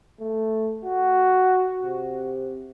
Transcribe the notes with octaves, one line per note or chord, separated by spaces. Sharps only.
A3
F#4
C3